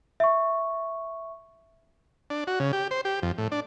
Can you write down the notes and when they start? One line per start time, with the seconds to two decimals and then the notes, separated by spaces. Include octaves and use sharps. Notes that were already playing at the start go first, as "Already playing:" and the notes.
0.20 E5 C#6
2.30 D4
2.47 F#4
2.60 C#3
2.73 G4
2.91 C5
3.05 G4
3.22 F2
3.38 A2
3.52 D4